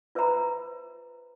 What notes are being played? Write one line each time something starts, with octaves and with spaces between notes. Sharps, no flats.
F4 B4 C5 E5 A#5 B5